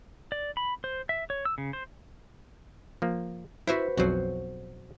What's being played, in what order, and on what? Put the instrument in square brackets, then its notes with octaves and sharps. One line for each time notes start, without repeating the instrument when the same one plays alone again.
[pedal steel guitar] D5
B5
C5
E5
C#5
E6
C#3
C5
[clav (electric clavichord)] F3 A#3
[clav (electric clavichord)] E4 E5 [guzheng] F#4 B4 C5
[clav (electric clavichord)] B1 F2 F#3 [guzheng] F#4 C5